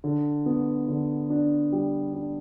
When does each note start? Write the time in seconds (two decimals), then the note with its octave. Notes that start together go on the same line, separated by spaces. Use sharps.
0.04 D3
0.46 B3
0.88 D3
1.30 D4
1.72 G3
2.14 D4